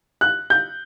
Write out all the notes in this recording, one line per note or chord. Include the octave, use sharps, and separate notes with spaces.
F#6
G6